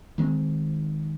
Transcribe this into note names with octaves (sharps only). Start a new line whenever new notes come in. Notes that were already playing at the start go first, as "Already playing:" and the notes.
D#3 G#3 C4